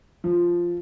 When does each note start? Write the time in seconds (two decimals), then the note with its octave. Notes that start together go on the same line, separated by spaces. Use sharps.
0.24 F3